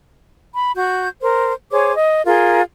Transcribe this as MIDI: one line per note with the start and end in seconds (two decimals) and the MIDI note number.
0.53 0.71 83
0.76 1.08 66
0.76 1.08 91
1.22 1.52 70
1.22 1.52 72
1.71 1.93 68
1.71 1.93 72
1.71 1.93 73
1.71 1.93 86
1.93 2.22 75
2.25 2.61 65
2.25 2.61 68
2.25 2.61 70